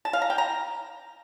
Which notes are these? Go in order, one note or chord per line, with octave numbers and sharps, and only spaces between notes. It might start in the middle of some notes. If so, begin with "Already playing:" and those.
A5
F5
A#5
G5
A#5